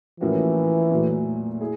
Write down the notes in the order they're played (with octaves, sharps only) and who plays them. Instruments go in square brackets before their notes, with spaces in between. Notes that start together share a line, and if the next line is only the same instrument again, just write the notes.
[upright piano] A2 F3 A#3 C#4 F#4 [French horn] E3
[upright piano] A#2 F#3 A3
E4 G#4